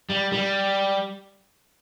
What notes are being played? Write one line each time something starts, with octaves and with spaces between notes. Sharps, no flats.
G3
G3